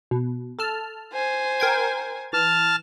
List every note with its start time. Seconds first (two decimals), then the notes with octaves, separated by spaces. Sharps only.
0.11 B2
0.59 A4 A5 F6
1.13 C5 G#5
1.60 A#4 G5 G#6
2.33 E3 A5 F6